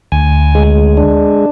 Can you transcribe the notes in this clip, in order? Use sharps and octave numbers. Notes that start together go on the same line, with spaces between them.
D2 G#5
G#3
D4